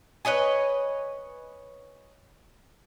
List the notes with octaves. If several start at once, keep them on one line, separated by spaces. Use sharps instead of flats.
B4 C#5 D#5 G#5